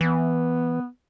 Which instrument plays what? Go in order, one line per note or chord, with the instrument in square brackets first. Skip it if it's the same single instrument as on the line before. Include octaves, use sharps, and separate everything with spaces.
[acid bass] E3 [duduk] B3